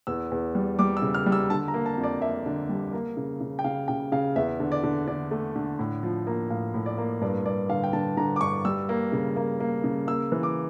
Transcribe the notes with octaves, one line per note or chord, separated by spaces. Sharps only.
E2 E6
E2
G3
G3 D6
E6
C#3
F6
G3
E6
D3 A5
A#5
A#3
A5
F2
D5
A#3 E5
D3
G3
A#3
C#3
C#3
G5
C#3 F5
C#3 G5
C#3 F5
E2 E5
D3
D5
D3
D3 D5
A3
D3
A2
F3
A#3
A2 F5
A2
D5
A#3
G2 D5
G2 D5
D3 F5
G5
D3 A5
D3 A#5
D6
G2 C#6
G3 E6
A#3
C#3
A#3
A#3
C#3
A#3 E6
E3
D6